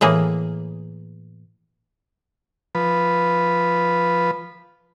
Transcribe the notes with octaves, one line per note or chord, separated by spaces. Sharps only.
A2 E3 A#3 G#4
F3 B4